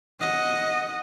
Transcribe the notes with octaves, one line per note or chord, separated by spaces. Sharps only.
D#5 F#5